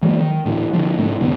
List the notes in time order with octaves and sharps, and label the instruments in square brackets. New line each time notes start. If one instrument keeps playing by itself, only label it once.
[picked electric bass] E3 F#3 G#3 A#3
D#3
A1 D2 A2
D3 E3 F3
G#2 C3 A3 D4
C#2 F#2 B2 D#3